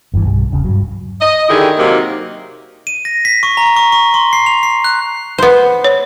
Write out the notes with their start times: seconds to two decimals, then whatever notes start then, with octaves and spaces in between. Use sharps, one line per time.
0.14 G1 G2 D3 E3
0.25 B1 G2 G3
0.52 E1 C#3
0.65 G2 F#3
1.22 D#5
1.49 D3 D#3 E4 G4 G#4
1.79 C3 F#3 A#3 D#4 A#4
2.87 D#7
3.05 A#6
3.25 B6
3.43 C#6
3.57 A#5
3.76 C#6
3.92 C#6
4.14 C6
4.33 C7
4.46 F7
4.63 C7
4.84 F#6
5.38 B3 C5
5.84 C#5